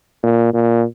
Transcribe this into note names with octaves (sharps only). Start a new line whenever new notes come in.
A#2
A#2